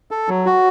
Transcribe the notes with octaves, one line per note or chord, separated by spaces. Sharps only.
A4
F#3
F#4